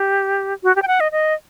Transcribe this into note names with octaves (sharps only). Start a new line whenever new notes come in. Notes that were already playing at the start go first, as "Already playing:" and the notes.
Already playing: G4
F#4
G4
G5
F#5
D#5
D#5